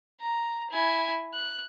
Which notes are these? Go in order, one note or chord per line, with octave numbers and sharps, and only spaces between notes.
A#5
E4 G#5
F#6